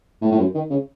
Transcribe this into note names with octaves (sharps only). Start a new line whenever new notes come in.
A2
A2
F#2
D#3
C#3